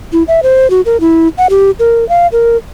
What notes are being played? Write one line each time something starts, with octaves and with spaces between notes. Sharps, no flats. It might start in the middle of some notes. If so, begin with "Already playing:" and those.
E4
E5
C5
F#4
A#4
E4
F#5
G4
A#4
F5
A#4